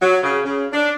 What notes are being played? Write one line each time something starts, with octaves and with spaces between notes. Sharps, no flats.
F#3
C#3
C#3
D4